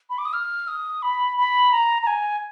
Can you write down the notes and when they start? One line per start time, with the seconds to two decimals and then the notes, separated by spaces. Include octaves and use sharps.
0.10 B5
0.18 D6
0.25 D#6
0.33 F6
0.68 D#6
1.02 B5
1.37 B5
1.72 A#5
2.02 A#5
2.07 G#5